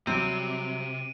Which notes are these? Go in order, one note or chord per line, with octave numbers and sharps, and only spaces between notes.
C3 F#3 G3 C4 D7 D#7